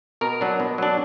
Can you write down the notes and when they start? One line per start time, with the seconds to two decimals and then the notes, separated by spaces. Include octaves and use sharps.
0.21 B2 A#4
0.41 F#3 D4
0.60 B2
0.78 F#3 D4